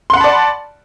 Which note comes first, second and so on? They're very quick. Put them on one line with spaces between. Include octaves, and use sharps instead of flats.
C6 F#5 B5 A5 D5